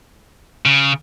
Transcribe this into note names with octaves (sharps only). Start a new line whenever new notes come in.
C#3